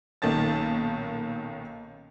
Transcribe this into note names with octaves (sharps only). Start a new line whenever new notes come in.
B1 A#2 D#3 C#4 A5 A6